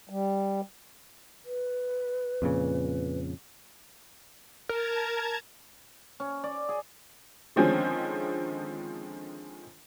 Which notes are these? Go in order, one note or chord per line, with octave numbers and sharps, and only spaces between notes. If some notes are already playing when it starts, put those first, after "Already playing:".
G3
B4
F2 A#2 C#3
A#4 A5 A#5 G#6
C#4
D5
G#4
D3 D#3 F3 G#3 C4 C#4